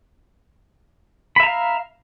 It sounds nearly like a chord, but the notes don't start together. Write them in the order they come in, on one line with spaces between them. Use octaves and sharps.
B5 E5 A#5 F5